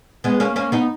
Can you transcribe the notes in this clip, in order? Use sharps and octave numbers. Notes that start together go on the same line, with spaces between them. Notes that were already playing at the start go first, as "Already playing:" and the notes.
G#3 B3
A#3 C#4
A#3 C#4
B3 D#4